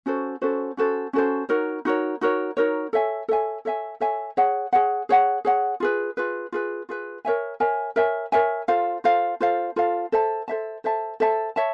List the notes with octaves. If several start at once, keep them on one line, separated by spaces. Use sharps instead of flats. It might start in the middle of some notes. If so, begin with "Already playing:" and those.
C#4 F#4 A4 C5
C#4 F#4 A4 C5
C#4 F#4 A4 C5
C#4 F#4 A4 C5
D#4 F#4 A#4 C#5
D#4 F#4 A#4 C#5
D#4 F#4 A#4 C#5
D#4 F#4 A#4 C#5
A4 C#5 E5 G#5
A4 C#5 E5 G#5
A4 C#5 E5 G#5
A4 C#5 E5 G#5
G#4 C#5 F#5
G#4 C#5 F#5
G#4 C#5 F#5
G#4 C#5 F#5
F4 G#4 B4
F4 G#4 B4
F4 G#4 B4
F4 G#4 B4
A#4 C#5 E5 G#5
A#4 C#5 E5 G#5
A#4 C#5 E5 G#5
A#4 C#5 E5 G#5
F4 A4 C5 F5
F4 A4 C5 F5
F4 A4 C5 F5
F4 A4 C5 F5
A4 C5 E5 A5
A4 C5 E5 A5
A4 C5 E5 A5
A4 C5 E5 A5
C#5 E5 A5